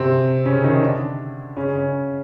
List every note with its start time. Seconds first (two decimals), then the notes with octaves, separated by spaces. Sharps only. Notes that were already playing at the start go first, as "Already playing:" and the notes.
Already playing: C3 C4
0.45 C#3 C#4
0.64 D#3 D#4
0.82 D3 D4
1.56 C#3 C#4
1.74 C#3 C#4